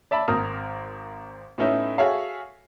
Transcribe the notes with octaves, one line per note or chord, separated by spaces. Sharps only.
D5 E5 A5 B5
G#1 C4 A#4 D#6 F6
A2 A3 B3 C#4 D#4 E4
F#4 G#4 A4 C#5 E5 F5